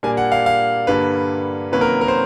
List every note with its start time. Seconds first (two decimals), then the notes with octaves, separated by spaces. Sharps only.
0.03 A#2 G3 A#3 D4 G#5
0.17 F#5
0.32 F5
0.46 F5
0.87 G2 D3 G3 A#3 B4
1.72 C3 D#3 F#3 A#3 C#4 B4
1.81 A#4
2.01 A#4
2.08 C5